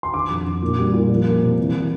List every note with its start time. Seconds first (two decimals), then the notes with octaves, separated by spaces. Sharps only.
0.03 C6
0.13 D3 D6
0.30 F2
0.46 D3
0.62 A#2
0.78 G3
0.93 A#2
1.10 F3
1.26 A#3
1.42 C3
1.58 E3
1.74 E3